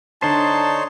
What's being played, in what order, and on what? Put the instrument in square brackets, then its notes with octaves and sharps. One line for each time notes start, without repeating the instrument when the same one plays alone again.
[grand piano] D3 [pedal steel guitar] D4 C5 [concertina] D#4 C#5 C6 [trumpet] A5